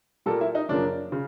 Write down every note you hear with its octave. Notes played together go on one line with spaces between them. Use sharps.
A#2 G3 A#3 A4
E4
D#4
F#2 C#3 F3 A#3 D4
C#3